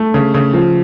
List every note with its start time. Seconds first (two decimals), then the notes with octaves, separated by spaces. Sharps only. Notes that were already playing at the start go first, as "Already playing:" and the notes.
Already playing: A3
0.14 C#3
0.34 C#3
0.54 F3